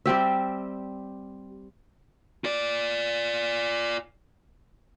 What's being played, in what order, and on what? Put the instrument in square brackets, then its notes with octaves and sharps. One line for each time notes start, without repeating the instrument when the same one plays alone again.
[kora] G3 C4 G4 E5
[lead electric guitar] F4 D5